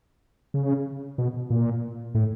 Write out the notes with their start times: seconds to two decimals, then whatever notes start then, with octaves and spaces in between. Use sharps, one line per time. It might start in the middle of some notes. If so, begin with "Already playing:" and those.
0.54 C#3
1.18 B2
1.50 A#2
2.14 A2